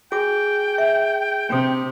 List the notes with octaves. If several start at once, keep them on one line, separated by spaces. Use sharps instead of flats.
F#4 G#4 G5 D6
E5
C3 D4 F5 D#6